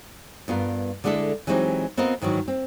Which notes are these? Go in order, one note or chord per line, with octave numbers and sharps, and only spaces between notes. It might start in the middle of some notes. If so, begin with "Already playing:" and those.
G2 B3 F4 A#4
D3 G#3 D4 E4 A4
E3 F#3 G#3 C4 D#4 G4
B3 C4 F4 A#4 D#5
G#2 D#3 E3 F#3
C4